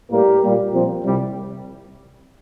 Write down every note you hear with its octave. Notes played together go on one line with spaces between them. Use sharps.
A2 G3 A#3 G4 A#4
A#2 G3 A#3
A#2 F3 C4
C2 C3 G3